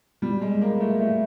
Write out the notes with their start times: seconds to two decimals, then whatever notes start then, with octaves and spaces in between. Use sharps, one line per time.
0.22 G3
0.42 G#3
0.61 A#3
0.80 A3
1.00 A3